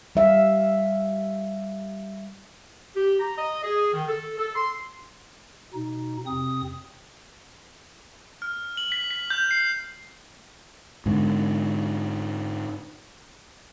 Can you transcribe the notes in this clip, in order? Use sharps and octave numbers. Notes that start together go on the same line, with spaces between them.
G3 E5 F5
G4
A#5
D#5
G#4
D#3
A4
A4
C6
B2 D#4
F2 C3 C4 D#6
F6
F#7
B6
B6
G6
C7
G#2 D3